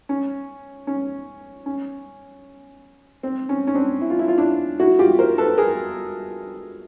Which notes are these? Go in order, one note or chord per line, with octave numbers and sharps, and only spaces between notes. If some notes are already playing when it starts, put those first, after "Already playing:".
C#4
C#4
C#4
C4
C#4
C#4
C4 D4
E4
F4
E4
F4
D4 E4
E4 F#4
F4 G4
A#4 C5
A4 B4
G#4 A#4